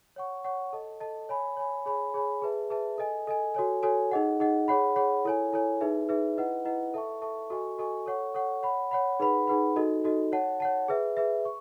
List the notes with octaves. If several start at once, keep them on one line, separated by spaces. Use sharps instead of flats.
C#5 F#5 C#6
C#5 F#5 C#6
A4 D#5 A5
A4 D#5 A5
C#5 G#5 B5
C#5 G#5 B5
G#4 C#5 G#5 B5
G#4 C#5 G#5 B5
G#4 B4 E5 A5
G#4 B4 E5 A5
A4 D#5 G#5
A4 D#5 G#5
F#4 A4 C#5 G#5
F#4 A4 C#5 G#5
D#4 G#4 D#5 F#5
D#4 G#4 D#5 F#5
G#4 C#5 F#5 B5
G#4 C#5 F#5 B5
E4 A4 C#5 G#5
E4 A4 C#5 G#5
D#4 G#4 B4 E5
D#4 G#4 B4 E5
E4 B4 D#5 F#5
E4 B4 D#5 F#5
A4 E5 A5 C#6
A4 E5 A5 C#6
F#4 A4 D#5 G#5 C#6
F#4 A4 D#5 G#5 C#6
A4 C#5 F#5 C#6
A4 C#5 F#5 C#6
C#5 F#5 B5
C#5 F#5 B5
D#4 G#4 B4 F#5 B5
D#4 G#4 B4 F#5 B5
D#4 F#4 A4 D#5
D#4 F#4 A4 D#5
C#5 F#5 A5
C#5 F#5 A5
G#4 B4 E5
G#4 B4 E5
C#6